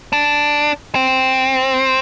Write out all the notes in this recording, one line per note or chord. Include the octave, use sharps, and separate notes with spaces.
D4
C4